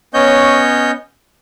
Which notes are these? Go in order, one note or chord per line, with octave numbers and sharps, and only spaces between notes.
B3 C#4 C#5 D#5 G6